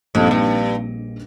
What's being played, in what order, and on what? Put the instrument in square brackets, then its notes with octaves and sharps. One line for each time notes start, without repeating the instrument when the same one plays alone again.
[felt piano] A#1 A#2 G3 C4 D#4 [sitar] F2
[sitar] G2